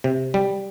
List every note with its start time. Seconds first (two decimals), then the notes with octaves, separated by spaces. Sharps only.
0.04 C3
0.34 G3